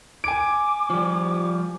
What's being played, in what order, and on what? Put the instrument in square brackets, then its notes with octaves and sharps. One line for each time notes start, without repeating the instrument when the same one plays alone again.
[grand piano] G#5 D7 [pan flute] D6
[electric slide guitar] F3 G3